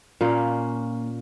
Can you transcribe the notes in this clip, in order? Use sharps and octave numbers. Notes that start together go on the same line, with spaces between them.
A#2 A#3 C#4